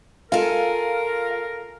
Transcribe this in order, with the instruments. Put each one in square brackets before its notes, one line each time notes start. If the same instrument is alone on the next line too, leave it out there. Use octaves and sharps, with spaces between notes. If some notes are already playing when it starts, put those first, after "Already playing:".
[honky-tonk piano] F4 [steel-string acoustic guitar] A4 G#5 [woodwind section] A#4 [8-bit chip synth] F5